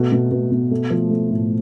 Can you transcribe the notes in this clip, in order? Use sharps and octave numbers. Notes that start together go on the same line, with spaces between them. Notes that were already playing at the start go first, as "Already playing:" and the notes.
Already playing: B2 A3
B2
B2
B2
A3
F3
A3
A2